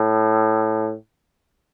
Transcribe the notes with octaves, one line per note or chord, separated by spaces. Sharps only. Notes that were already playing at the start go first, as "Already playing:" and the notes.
Already playing: A2